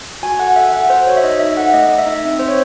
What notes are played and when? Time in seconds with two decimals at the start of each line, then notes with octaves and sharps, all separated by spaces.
0.23 F#4 G#5
0.39 A4 F#5
0.56 A4 E5
0.73 A4 F#5
0.90 F#4 C5
1.07 F#4 C#5
1.17 E5
1.23 D#4 D#5
1.40 D#4 E5
1.56 A4 F#5
1.74 A3 D#5
1.90 A3
1.98 E5
2.06 D#4
2.24 C4 E5
2.39 C4 C5
2.48 C#5